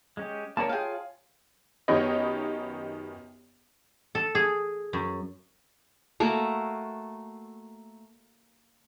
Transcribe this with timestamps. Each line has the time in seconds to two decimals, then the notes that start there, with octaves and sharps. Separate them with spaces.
0.17 G#3 C#4 G4
0.57 D3 A#3 C4 C#4 A#4 C#5 D5 A5
0.69 F4 G#4 E5 F5 G5
1.88 F#2 D#3 B3 G4 C#5 D#5
4.15 A4
4.35 G#4
4.93 F#2
6.20 A3 A#3 F#4